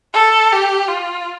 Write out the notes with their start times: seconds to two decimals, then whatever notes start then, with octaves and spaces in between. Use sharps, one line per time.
0.14 A4
0.52 G4
0.88 F4